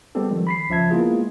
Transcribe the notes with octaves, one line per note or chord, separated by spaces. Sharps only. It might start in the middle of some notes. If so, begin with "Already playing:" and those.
G3 G#3 B3 C4 G4 A4
D#3 F3
B5 B6 C7
C#2 F3 C#4 E5 A5 G#6
G#3 A#3 B3 E4 F4 G#4